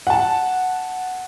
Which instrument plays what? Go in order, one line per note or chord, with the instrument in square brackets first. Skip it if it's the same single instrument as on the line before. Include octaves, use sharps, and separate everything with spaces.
[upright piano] F#5 A5